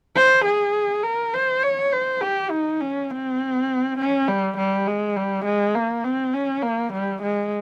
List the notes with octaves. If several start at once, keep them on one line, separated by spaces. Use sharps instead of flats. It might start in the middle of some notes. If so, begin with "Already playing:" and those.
C5
G#4
A#4
C5
C#5
C5
G4
D#4
C#4
C4
C#4
G3
G3
G#3
G3
G#3
A#3
C4
C#4
A#3
G3
G#3